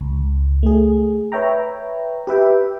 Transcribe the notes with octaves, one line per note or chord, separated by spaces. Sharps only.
C#2
A3 G#4
B4 C#5 E5 G5 A#5
G4 B4 E5 G5